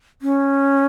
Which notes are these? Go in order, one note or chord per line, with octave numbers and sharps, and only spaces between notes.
C#4